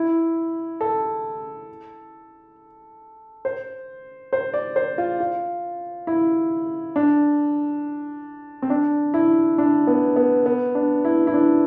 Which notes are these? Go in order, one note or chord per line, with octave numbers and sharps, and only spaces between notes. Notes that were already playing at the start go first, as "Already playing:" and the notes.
Already playing: E4
A4
C5
C5
D5
C5
F4
F4
E4
D4
C4
D4
E4
D4
B3
B3
B3
D4
E4
E4
D4